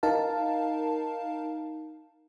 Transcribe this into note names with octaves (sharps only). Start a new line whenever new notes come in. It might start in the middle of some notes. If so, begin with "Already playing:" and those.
D#4 A#4 F5 A5